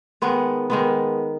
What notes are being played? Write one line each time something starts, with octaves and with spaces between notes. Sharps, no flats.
D#3 G#3 B3
D#3 G#3 B3